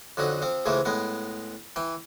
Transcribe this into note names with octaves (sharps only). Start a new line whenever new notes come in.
F2 D3 F#3 D#4
F3 C4
C#2 G#2 E3 F3 A3
A2 G#3 B3
E3 G5